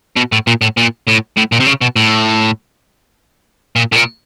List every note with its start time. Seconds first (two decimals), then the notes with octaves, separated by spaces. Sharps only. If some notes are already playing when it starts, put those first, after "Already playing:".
0.17 B2
0.32 A2
0.47 A#2
0.61 A2
0.77 A#2
1.07 A2
1.37 A2
1.52 A#2
1.60 C3
1.67 C#3
1.82 B2
1.96 A2
3.76 A#2
3.92 A2
3.96 A#2